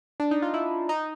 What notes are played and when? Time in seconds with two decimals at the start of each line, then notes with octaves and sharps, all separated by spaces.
0.20 D4
0.31 D#4
0.42 F4
0.54 E4
0.89 D#4